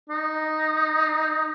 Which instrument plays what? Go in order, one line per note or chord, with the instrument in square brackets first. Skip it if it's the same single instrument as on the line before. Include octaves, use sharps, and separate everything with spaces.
[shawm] D#4